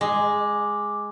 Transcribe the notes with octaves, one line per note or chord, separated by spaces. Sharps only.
G#3 D6